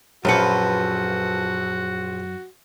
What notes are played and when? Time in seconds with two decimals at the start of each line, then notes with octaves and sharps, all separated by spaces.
0.25 A#1 F#2 F3 F4 F#4 A4 B4 F#5